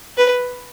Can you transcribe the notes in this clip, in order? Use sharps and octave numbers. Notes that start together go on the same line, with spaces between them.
B4